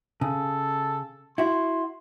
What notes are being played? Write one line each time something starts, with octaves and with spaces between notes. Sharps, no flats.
C#3 A4
E4 F#4 C6